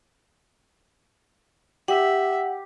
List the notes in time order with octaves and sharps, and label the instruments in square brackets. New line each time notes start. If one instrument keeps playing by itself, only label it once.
[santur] G4 [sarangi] E5 [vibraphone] F#5